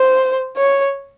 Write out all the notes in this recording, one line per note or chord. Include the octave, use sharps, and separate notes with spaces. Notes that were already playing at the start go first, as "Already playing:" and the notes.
Already playing: C5
C#5